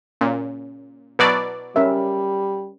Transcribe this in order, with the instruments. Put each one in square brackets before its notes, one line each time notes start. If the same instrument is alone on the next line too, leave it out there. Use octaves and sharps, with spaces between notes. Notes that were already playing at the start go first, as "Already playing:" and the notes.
[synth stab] A#2 [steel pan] C#4
[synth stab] B2 F#3 D5 [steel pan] B4
[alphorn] G3 [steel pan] C#4 A#4 E5